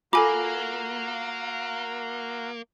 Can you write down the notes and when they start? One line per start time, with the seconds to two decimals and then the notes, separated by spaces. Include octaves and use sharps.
0.13 A#3 F4 F#4 A4 F5 G#5 A#5 D6